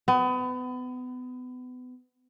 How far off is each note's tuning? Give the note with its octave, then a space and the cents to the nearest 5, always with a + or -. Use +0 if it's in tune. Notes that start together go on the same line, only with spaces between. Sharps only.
B3 +30